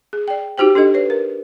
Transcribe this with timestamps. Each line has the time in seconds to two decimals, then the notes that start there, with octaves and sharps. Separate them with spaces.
0.13 G#4
0.28 D5 G5
0.58 D#4 F#4 G4 C5 G5
0.75 D4 G4 A4 D#5
0.94 B4 C#5
1.10 A#4